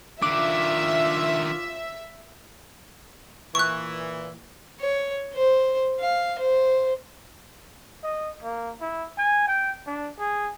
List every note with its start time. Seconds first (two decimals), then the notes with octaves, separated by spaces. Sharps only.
0.22 D#3 D4 F4 E5 D6
3.55 A#2 E3 C#6 F#6
4.80 C#5
5.34 C5
6.00 F5
6.39 C5
8.03 D#5
8.43 A#3
8.81 E4
9.18 G#5
9.47 G5
9.87 D4
10.19 G#4